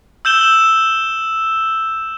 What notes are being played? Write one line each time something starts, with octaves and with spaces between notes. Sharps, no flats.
E6 G6 E7 G7
E6 E7